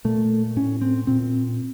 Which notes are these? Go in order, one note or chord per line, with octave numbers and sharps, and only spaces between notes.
A#2 A3
A2 C#4
C4
A#2 C4